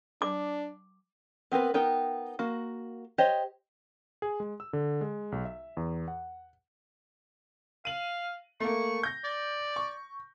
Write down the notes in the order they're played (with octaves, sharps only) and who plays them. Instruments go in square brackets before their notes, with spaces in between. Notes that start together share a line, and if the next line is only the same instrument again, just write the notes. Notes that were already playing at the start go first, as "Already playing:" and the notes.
[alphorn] D4 [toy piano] D6
[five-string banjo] B3 C4 A#4 B4
B3 D#4 A#4 G5
A#3 F#4
G4 C5 C#5 D#5
[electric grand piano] G#4
G#3
E6
D3
G#3
B1
E5
E2
F#5
[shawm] F5 [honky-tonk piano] D#7 F#7
[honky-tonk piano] A3 A#3 [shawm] C#6
[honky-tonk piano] G6 A#6
[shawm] D5
[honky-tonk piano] C#6